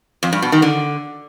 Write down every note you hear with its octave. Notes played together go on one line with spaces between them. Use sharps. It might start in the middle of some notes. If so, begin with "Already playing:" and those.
F2
G2
B2
D#3
D3